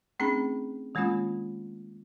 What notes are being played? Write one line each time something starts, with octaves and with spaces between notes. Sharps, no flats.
A3 C4 C#4 D#4 G#4 B5
D#3 G#3 A#3 C#4 F4